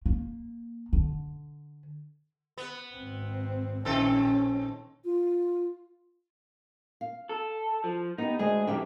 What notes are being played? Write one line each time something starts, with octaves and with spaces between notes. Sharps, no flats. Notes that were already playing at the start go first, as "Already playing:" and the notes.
A#3
D3
B3
G#1 C4
A#1 D#3 C4 C#4 A4
F4
F5
A4
F3
B3 D#4 G4
D2 G#3 G#4 D#5
C2 F2 D3 G4 E5 G5